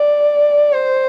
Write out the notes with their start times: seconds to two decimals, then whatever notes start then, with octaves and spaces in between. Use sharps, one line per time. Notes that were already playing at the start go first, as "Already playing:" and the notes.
Already playing: D5
0.73 C5